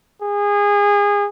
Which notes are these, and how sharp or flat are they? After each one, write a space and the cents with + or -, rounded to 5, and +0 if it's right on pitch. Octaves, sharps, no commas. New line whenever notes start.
G#4 -25